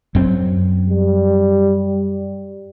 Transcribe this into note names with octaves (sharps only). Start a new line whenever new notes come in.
F#2 F#3 C4
G3